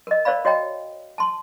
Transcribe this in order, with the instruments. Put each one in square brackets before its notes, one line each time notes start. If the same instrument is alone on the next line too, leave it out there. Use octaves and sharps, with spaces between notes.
[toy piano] A#4 D#5
A#4 C5 D5 F5 B5
F#4 C#5 D#5 G5 A#5
A5 C6